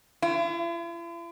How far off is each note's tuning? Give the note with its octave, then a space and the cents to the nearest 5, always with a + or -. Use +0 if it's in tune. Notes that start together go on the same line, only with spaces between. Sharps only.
E4 +45